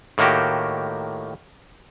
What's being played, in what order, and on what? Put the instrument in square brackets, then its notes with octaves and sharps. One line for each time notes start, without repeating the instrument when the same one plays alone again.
[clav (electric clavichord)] A2 D#3 A#3 F#4 G4